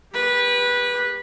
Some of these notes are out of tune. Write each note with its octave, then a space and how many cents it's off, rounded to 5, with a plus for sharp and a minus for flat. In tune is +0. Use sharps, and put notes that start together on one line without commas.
G4 +25 B4 -15